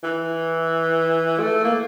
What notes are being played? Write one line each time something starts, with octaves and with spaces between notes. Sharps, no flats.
E3
A3
A#3